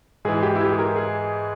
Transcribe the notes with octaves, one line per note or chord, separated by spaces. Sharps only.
G#2 E3 G#4
G4
E4
G4
G#4
A#4
G#4